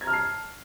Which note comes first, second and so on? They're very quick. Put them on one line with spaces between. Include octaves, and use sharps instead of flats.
G#6 A#5 F6 A5 C7